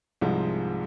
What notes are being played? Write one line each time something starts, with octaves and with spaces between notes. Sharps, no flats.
C2 G#2 C3 F3 G#3